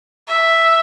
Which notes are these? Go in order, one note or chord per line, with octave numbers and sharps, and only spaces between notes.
E5